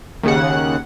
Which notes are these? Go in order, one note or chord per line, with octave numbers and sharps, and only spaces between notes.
D#2 C#3 F#5